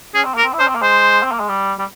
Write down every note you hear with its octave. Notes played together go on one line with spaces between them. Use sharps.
C#4 G#4
C4
A#3 A#4
C4
E4
C#4 C5
C4
A#3
G#3 C5
C4
A#3
G#3
G3
G3